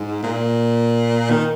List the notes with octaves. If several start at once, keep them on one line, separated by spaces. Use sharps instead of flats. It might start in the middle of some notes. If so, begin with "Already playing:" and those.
Already playing: G#2
A#2
D#3